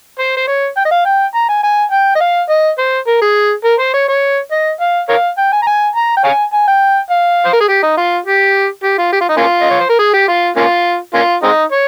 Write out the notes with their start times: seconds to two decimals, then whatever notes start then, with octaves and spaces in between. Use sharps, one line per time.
0.19 C5
0.37 C5
0.47 C#5
0.77 G5
0.85 D#5
0.91 F5
1.06 G5
1.34 A#5
1.49 G#5
1.63 G#5
1.91 G5
2.15 D#5
2.21 F5
2.49 D#5
2.78 C5
3.07 A#4
3.21 G#4
3.64 A#4
3.79 C5
3.94 C#5
4.08 C#5
4.51 D#5
4.80 F5
5.09 A#4 C#5 F5
5.38 G5
5.52 G#5
5.62 A#5
5.67 G#5
5.96 A#5
6.17 G5
6.24 C#5 F5 G#5
6.53 G#5
6.68 G5
7.10 F5
7.45 C5
7.53 A#4
7.60 G#4
7.68 G4
7.83 D#4
7.97 F4
8.26 G4
8.83 G4
8.98 F4
9.12 G4
9.21 F4
9.29 D#4
9.37 A#3 C#4 F4
9.61 D#5
9.70 C#5
9.80 C5
9.89 A#4
9.99 G#4
10.13 G4
10.28 F4
10.56 A#3 C#4 F4
11.14 A#3 C#4 F4
11.43 G#3 C4 D#4
11.72 C#5